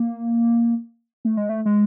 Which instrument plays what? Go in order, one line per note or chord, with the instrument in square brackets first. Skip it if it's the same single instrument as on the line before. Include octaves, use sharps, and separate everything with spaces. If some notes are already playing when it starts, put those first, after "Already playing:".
Already playing: [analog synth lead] A#3
A3
G#3
A3
G#3